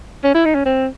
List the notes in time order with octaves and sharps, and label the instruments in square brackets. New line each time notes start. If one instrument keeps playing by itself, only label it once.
[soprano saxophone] C#4
E4
D#4
C#4
C4